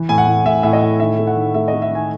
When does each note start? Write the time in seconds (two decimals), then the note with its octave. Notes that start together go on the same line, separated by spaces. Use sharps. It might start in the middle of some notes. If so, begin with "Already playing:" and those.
Already playing: E3
0.09 A2 G#5
0.18 F#5
0.27 A2
0.45 A2 E5
0.63 A2 E5
0.73 D#5
0.82 A2
1.00 D#3 E5
1.18 A3
1.27 F#5
1.36 D#3
1.54 A3 E5
1.68 D#5
1.73 A3
1.82 E5
1.91 D#3 G#5